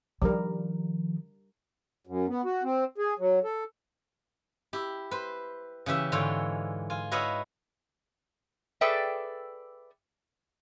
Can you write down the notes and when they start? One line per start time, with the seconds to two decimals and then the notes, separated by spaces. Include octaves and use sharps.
0.22 D#3 F3 G3 A#4
2.07 F#2
2.28 B3
2.45 F#4
2.63 C4
2.98 G#4
3.19 F#3
3.44 A4
4.73 E4 G4
5.11 B4 C5
5.86 C#3 E3 G4 E5
6.12 G#2 D3 E3 F4 C#5 G5
6.90 F4 G#5
7.11 E4 F#4 B4 C#5 D#5 F5
8.81 G#4 A4 B4 D5 E5 G5